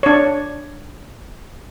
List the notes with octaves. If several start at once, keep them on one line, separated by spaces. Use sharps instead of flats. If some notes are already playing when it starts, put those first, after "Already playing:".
D4 C#5